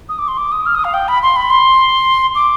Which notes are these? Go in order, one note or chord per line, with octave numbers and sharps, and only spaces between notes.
D#6
D6
C6
D6
D#6
F6
D#6
F5
G5
B5
C6
B5
C6
D6